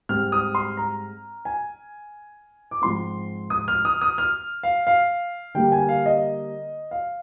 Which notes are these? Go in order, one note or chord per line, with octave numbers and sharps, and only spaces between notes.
G#2 G3 C4 F6
D#6
C6
A#5
G#5
D6
G#2 F3 C4 C6
D#6
F6
D#6
D#6
F6
F5
F5
D3 G3 A#3 G5
G#5
F5
D#5
F5